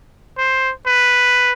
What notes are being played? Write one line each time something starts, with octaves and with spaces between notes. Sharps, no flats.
C5
B4